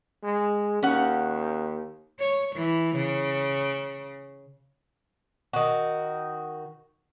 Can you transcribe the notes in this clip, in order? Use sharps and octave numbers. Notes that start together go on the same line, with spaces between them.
G#3
D#2 C#4 F#5
C#5
E3
C#3
D#3 F#4